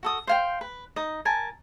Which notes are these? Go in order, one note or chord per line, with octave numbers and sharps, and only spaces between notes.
F#4 A4 D#6
C5 F5 G5
B4
D#4 D#5
A#4 G#5 A5